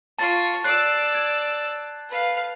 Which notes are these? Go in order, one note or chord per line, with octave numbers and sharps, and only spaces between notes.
F4 A5 C#6 A6
D5 E6 F#6 C7
G#6
B4 F5